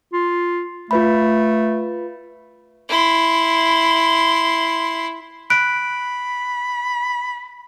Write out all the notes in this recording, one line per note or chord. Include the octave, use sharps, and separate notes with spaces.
F4
A3 F4 B4 B5
E4 C6
B5 F#6 D7